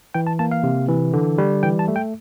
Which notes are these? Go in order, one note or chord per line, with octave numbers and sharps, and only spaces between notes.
E3 G5
A5
A#3 A5
F5
C3
E3
D3
G3
E3 G5
A5
A3
G5